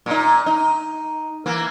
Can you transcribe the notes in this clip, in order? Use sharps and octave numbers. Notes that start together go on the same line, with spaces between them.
A#2 D#4
D#4
E3 A#3